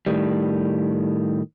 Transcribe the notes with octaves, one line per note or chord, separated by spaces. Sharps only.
A2 D#3 G3